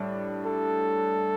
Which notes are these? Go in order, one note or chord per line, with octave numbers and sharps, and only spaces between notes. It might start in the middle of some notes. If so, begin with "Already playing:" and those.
Already playing: A2 G3 D4
A4